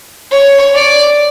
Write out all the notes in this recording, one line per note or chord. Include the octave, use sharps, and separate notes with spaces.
C#5
D5